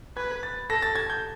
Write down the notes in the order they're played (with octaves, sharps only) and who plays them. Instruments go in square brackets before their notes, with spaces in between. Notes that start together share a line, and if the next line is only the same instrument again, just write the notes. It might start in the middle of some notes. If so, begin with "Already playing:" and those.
[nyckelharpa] B4 [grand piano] G#6
[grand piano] A6
[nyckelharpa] A4 [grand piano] A#6
[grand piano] A6
G#6
G6